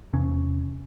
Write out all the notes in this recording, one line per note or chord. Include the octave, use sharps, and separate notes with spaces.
E2 C3 C#4